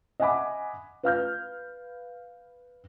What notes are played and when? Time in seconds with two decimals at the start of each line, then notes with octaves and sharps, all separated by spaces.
0.20 D#5 E5 F#5 G#5 B5 D6
1.03 B4 F5 F6 G6